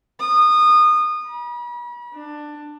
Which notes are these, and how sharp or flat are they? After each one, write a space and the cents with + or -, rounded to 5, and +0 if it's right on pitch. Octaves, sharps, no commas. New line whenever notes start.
D#6 -25
B5 -40
D4 +15